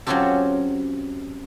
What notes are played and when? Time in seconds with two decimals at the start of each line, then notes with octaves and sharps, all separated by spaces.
0.07 F#3 C4 C#4 F4 G4 A4